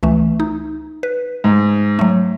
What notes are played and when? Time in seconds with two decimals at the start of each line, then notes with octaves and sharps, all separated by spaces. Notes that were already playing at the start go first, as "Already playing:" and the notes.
0.03 C#2 E3 A3
0.40 D#4
1.03 B4
1.44 G#2
1.99 F#3 A3